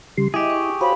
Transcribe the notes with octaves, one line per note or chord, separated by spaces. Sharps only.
C#3 G3 C6
E4 G4 G#4 D#5 E5 D6
C#6
F#4 C5 C#5 F5 B5